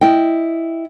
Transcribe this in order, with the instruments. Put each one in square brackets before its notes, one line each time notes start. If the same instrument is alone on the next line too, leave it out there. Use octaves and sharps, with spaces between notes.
[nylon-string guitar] E4 D#5 G5